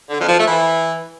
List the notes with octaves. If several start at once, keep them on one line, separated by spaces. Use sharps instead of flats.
D3
F2
F3
A3
E3